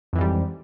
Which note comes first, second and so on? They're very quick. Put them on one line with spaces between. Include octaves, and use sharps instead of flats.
F2 E3 G#2 G3